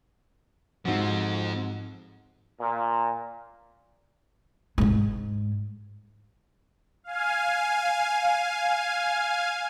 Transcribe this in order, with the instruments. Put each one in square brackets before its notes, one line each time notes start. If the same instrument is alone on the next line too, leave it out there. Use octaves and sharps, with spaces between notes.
[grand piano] G#2 F#4 [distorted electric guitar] F3 C4
[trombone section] A#2
[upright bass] G#2 G#3
[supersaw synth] F5 G#5